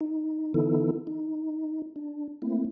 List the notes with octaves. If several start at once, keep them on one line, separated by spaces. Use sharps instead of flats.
D#4
D3 E3 B3 D#4 E4 A4
D#4
D4
A3 A#3 C4 E4